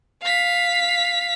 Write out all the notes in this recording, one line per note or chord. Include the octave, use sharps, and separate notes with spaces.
F5 B6